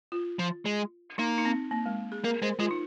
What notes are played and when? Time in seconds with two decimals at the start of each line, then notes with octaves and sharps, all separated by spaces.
0.12 F4
0.39 F3
0.65 G#3
1.18 A#3 D#4
1.38 D#4
1.45 C4
1.71 A#3
1.86 G#3
2.12 G#4
2.24 A#3 A#4
2.42 G#3 C5
2.59 G#3 F4
2.71 D#4